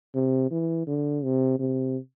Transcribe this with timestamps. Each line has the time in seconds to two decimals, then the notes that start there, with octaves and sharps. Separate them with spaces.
0.15 C3
0.51 E3
0.87 D3
1.24 C3
1.59 C3